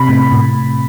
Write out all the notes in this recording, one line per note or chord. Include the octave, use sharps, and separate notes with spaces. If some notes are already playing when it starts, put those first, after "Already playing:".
Already playing: C3 B5
A2
A2